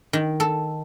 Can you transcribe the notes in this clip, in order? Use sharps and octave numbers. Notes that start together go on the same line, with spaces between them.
D#3
A4